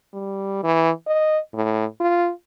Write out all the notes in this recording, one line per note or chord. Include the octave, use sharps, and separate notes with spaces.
G3
E3
D#5
A2
F4